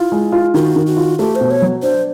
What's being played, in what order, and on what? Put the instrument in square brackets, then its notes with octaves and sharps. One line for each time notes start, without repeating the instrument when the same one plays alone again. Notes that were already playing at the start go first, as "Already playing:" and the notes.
Already playing: [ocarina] E4 [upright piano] F4
[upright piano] G#3
F4
[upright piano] D#3 [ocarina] G4
[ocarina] F#4
[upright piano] D#3
[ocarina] F#4
[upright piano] F4
[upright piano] A3 [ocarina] G4
[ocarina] C5
[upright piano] B2
[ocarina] C#5
[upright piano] F#3
[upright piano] D4 [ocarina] C5